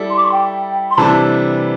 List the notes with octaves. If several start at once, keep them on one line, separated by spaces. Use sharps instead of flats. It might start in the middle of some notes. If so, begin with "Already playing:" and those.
Already playing: G3 E4 A4 D5
C6
D6
C6
G5
C6
C3 E3 G3 D4 A4 A5